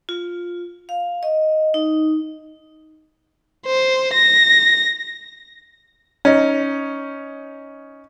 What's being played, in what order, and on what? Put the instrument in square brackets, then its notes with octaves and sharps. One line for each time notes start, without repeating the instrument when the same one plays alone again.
[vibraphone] F4
F5
D#5
D#4
[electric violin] C5
A#6
[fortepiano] C#4 D#4